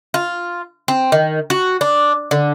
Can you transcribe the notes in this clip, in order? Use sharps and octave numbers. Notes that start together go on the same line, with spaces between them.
F4
C4
D#3
F#4
D4
D3